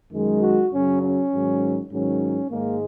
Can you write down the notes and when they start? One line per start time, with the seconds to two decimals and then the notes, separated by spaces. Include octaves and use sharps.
0.12 F#2 D#3 G#3
0.42 F#4
0.72 F#2 C#3 F#3 C#4
1.02 C#4
1.32 G#2 D#3 F#3
1.91 G#2 D#3 F#3 C#4
2.51 G#2 D#3 G#3 A#3